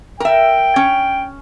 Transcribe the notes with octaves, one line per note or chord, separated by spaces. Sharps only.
A#4 E5 G5
C#4